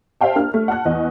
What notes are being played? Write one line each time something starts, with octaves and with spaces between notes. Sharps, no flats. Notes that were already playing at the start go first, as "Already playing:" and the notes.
C5 E5 F5 G5 A5
A#3 D4 F6
A3
F#5 A5 F#6
E2 D#5 F#5